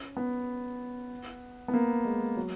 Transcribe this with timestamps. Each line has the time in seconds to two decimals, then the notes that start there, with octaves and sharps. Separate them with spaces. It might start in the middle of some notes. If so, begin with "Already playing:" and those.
Already playing: C#4
0.17 B3
1.68 B3
1.74 A#3
2.05 G#3
2.37 F#3